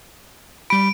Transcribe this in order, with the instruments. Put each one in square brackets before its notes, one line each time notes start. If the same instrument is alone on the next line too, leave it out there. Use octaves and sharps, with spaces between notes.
[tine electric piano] G3 B5 [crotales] D7